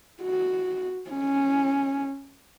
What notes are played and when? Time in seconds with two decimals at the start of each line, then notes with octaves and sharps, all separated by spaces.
0.22 F#4
1.10 C#4